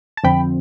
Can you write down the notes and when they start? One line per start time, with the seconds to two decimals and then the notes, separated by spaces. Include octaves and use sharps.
0.17 A5
0.24 F2 D3 F3 C4 G5 B5